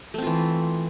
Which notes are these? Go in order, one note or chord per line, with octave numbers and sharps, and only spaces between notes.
E3 A3 C4 F4